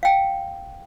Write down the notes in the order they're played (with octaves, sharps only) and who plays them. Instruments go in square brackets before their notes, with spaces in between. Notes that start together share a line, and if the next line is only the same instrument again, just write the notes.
[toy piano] F5 G5